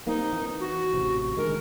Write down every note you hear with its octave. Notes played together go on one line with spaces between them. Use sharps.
G3 A#3 C4 D#4
E3
F#4
A1 C3
D3 D#3 G#3 A#4